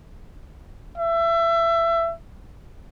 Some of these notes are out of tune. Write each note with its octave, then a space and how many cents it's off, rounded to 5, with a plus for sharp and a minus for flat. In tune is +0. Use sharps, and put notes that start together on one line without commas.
E5 +25